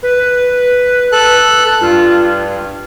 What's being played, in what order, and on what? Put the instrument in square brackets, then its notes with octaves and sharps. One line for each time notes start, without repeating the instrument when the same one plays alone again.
[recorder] B4
[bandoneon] A4 F#6
[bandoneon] G2 [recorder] F4